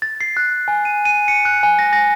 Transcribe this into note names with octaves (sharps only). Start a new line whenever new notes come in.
A6
C7
F#6
G#5
D#7
D#7
C#7
F#6
G#5
A#6
A#6